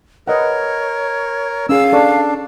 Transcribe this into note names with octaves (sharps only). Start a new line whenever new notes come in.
A#4 B4 C#5 D#5 F#5
C#4 G#4 F5 E6
D4 A4 D5 C#6